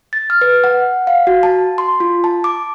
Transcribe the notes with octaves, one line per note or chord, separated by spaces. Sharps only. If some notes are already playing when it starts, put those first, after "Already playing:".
A6
F6
B4
F#5
F5
F#4
A5
C6
F4
A5
D6